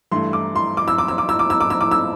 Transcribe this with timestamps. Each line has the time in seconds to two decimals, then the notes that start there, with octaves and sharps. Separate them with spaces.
0.11 G2 E3 A3 C6
0.33 D6
0.56 C6
0.77 D6
0.88 E6
0.98 D6
1.08 E6
1.18 D6
1.29 E6
1.39 D6
1.50 E6
1.61 D6
1.70 E6
1.81 D6
1.91 E6